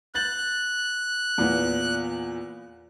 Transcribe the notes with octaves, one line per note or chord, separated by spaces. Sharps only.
F#6 G6 A6 F#7
E2 A#2 B3